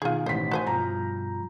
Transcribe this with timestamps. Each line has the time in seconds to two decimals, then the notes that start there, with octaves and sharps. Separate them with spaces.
0.02 B2 D#3 F4 G#4
0.26 A1 C5 B6
0.51 F#4 C5 G#5
0.67 G2 B2 F3 A#5